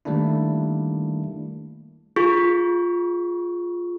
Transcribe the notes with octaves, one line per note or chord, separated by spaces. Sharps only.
D#3 G3 A3 A#3 D4 E4
F4 G#4 C#6